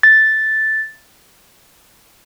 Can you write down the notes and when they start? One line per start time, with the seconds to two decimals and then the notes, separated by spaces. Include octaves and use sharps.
0.03 A6